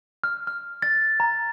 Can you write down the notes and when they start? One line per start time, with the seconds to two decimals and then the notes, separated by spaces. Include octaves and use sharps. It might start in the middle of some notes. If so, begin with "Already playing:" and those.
0.24 F6
0.47 F6
0.82 A6
1.20 A#5